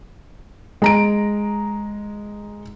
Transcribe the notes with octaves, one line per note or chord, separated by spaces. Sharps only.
G#3 A#5 D7